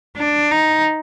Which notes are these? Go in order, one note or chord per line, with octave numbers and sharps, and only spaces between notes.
D4
D#4